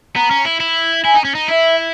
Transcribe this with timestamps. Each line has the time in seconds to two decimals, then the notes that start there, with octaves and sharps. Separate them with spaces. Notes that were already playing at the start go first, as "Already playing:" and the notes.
0.16 B3 A#5
0.31 C#4
0.45 E4
0.60 E4
1.04 E4 G#5
1.14 D#4
1.25 C#4
1.35 D#4
1.48 E4 E5